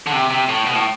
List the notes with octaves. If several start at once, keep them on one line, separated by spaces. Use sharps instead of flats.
D3
C3
C3
A2
B2
A2